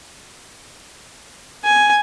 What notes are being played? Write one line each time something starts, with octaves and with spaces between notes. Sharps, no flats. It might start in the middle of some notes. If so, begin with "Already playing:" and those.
G#5